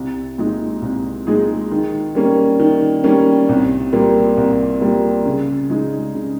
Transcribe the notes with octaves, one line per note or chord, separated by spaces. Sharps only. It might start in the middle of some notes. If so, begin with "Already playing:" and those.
Already playing: C2
A#2 G#3 D#4 G#4
C2
A#2 G#3 D#4 G#4
D#3
G3 A#3 C#4
D#3
G3 A#3 C#4
C2
A#2 G3 A#3
C2
A#2 G3 A#3
C#3
G#3 D#4 G#4
C#3